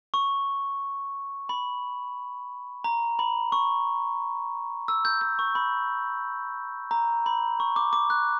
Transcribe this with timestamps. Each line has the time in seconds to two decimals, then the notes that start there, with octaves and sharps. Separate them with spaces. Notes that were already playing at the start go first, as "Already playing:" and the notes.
0.14 C#6
1.49 B5
2.84 A#5
3.19 B5
3.52 C#6
4.88 E6
5.05 G6
5.21 G6
5.39 C#6
5.55 B5
6.91 A#5
7.26 B5
7.60 C#6
7.76 D6
7.93 D6
8.10 F#6